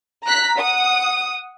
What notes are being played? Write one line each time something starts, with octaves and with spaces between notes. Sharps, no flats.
A#5 F#6 B6
F#5 D#6